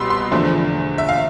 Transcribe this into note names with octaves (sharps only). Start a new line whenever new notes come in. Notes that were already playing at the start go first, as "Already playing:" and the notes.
Already playing: C2 B2 G3 B3 B5 C6 E6
C6
E2 D3 F3 A3 D4
E5
F5